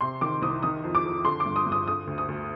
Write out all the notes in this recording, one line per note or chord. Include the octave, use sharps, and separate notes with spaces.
C3 C6
D#3 D6
C2 D#6
D#3 D#6
F2
D6
F2
D3 C6
D6
G2
D#6
G2
D#6
D3 D#6
D2
D#6
D2